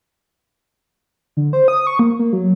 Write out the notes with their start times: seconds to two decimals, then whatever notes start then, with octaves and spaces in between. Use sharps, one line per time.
1.37 D3
1.53 C5
1.68 D#6
1.87 C#6
1.99 A#3
2.19 A#3
2.33 F#3